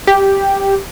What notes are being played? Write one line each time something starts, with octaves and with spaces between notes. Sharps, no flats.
G4